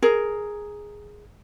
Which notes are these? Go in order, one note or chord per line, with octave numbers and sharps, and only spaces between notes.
G#4 A#4